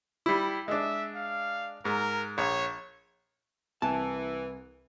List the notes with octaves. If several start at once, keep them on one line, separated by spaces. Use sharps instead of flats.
G3 E4
G#3 D4 E5
F5
G#2 A#4
A#1 C#5
C2 E3 G#5 A5